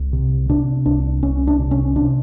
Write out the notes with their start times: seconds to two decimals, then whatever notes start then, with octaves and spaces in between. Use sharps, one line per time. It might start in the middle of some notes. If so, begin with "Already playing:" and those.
Already playing: C2
0.13 C3
0.49 C3 D4
0.86 C2 D4
1.23 C2 C#4
1.47 D4
1.59 C3
1.71 C#4
1.96 C3 D4